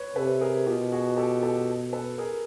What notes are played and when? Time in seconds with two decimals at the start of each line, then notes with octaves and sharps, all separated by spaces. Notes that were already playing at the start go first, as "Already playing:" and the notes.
Already playing: B4 C#5
0.16 C3 A4 B4
0.41 G#4 A#4
0.66 B2 F4 G4
0.92 F#4 G#4
1.17 G4 A4
1.43 G4 A4
1.93 A4 B4
2.18 G#4 A#4